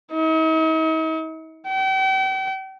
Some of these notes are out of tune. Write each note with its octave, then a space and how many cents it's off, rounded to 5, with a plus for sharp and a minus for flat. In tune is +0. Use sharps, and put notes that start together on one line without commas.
D#4 +45
G5 -40